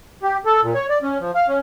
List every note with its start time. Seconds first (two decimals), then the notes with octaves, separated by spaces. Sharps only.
0.23 G4
0.45 A4
0.63 A#2
0.74 C#5
0.89 D5
1.02 C#4
1.20 F3
1.35 F5
1.48 C#4